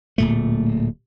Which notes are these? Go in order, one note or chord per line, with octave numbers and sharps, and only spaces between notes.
D1 A#2 A3